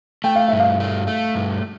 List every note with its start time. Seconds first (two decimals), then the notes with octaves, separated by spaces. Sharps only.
0.24 A3 G5
0.35 F5
0.48 G2 E5
0.60 F5
0.80 A3
1.07 A3
1.35 G2